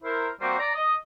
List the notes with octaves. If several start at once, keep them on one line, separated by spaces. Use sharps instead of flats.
E4 A#4 C5
G3 A#3 C4 F#4 A#4 C5
D5 A#5
D#5